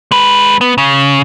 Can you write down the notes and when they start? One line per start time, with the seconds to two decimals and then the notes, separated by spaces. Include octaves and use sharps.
0.11 G#3 B4
0.61 B3
0.78 C#3